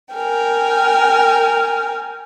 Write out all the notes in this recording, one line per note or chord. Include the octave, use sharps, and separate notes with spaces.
A#4 G5 G#5